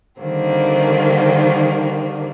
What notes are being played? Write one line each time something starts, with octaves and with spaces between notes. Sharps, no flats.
D3 D#3 G3 A#3 C4